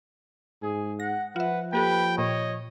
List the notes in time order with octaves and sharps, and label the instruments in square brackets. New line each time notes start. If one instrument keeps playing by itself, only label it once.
[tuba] G#2 [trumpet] G#4
[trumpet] F#5 [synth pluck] A#6
[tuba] F3 [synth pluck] F4 E5 [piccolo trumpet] B4 [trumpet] F#5
[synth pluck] A#3 G4 A4 [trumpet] B4 [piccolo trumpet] G5
[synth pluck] A#2 [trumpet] C#5 [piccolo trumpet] D#5